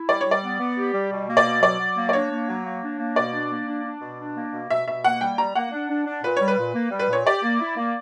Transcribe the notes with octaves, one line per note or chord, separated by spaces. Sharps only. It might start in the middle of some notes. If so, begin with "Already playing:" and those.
Already playing: E4
G3 D5
C#5
G3 D5
B3
B3
G4
G3
B2
A#3
D5
B2
F#3 D5
F#3
A#3
D5
D4 C#5
A#3
F#3
A#3
D4
A#3
B2 D5
D4
A#3
D4
D4
B2
D4
A#3
B2
B2 E5
B2 E5
A#3 F#5
G3 G5
G3 A#5
A#3 F#5
D4
D4
D4
A#2 B4
G3 C#5
B4
A#2
A#3
G3
B4
A#2 C#5
G4 D5
A#3
E4
A#3